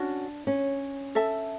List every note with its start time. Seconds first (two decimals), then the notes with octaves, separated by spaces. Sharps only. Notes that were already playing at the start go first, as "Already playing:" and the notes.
Already playing: C#4 D4 F#4
0.47 C#4
1.15 A4 E5 A5